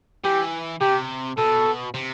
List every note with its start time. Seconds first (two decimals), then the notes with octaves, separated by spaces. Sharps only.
0.24 E3 G4
0.81 C3 G4
1.37 B2 A4
1.94 C3